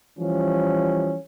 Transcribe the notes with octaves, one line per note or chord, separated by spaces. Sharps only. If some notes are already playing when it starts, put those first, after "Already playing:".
E3 F3 G3 C#4